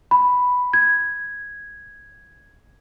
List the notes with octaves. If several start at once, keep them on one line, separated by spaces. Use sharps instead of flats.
B5
G#6